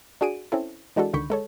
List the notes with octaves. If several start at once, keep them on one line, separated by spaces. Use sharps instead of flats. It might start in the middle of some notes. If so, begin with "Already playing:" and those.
D4 F#4 G#4 D7 D#7
C4 C#4 E4 A4
E3 G#3 D4 F#4 A4
C#2 D3 D#3 B5 C#6 G6
G#3 A4 C#5